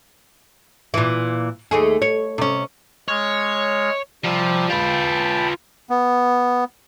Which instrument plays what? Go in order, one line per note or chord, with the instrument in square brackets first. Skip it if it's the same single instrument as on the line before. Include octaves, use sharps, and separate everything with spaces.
[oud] A#2 E3
D#2 A3 G#4
C#5
C3 C#4
[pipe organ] G#3 F6 [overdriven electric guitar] C#5
[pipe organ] C3 G3 [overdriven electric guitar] F3
[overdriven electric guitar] F4 B4 [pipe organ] G5 A5 B5
[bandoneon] B3